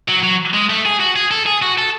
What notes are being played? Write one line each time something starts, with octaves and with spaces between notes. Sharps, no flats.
F#3
F#3
G#3
A3
G#4
F#4
G#4
A4
G#4
F#4
A4